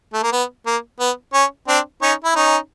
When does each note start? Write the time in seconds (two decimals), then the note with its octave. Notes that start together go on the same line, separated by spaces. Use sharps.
0.13 A3
0.23 A#3
0.32 B3
0.66 A#3
1.00 B3
1.34 C#4
1.68 C4 D4
2.02 C#4 D#4
2.25 E4
2.36 C#4 D#4